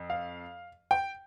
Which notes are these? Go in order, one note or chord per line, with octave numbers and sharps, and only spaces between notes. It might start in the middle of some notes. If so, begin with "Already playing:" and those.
Already playing: F2
F5
G5